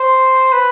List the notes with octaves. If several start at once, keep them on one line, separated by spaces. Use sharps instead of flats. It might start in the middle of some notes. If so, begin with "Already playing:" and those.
Already playing: C5
B4